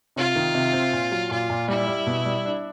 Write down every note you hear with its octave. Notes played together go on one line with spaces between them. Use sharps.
C3 F4
D#3
C3
C4
A#2
F#3
A#2 F4
A#2
G3 E4
G3
B2
G3
D4